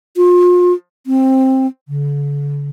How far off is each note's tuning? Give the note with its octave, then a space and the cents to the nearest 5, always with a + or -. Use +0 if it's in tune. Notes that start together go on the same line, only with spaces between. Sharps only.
F4 +35
C4 +15
D3 -40